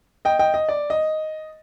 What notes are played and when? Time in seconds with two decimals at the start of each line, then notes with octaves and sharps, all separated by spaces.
0.25 D#5 G5
0.39 D#5 G5
0.54 D#5
0.69 D5
0.90 D#5